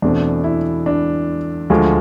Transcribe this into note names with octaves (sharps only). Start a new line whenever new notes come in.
E2 B2 A3 C4 D4
E4
D4
D2 D3 F3 G#3